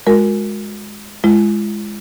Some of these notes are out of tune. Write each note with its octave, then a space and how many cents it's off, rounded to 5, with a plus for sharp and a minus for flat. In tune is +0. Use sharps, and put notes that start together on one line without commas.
G#3 +0 F#4 -30 A#4 +0
G#3 +5 F4 -45